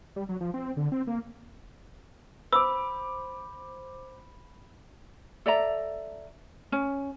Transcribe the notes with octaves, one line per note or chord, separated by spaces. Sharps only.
G3
F#3
F3
C4
D3
C4
A#3
C5 B5 D6 E6
A4 D5 E5 A#5
C#4